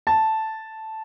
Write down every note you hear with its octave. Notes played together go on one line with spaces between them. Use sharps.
A5